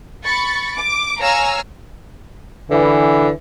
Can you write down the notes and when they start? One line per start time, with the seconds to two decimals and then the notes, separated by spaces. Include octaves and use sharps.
0.24 B5 C#6 A6 C#7
0.75 D6
1.19 C#5 F5 G#5 A#5 E6 F6
2.71 D3 E3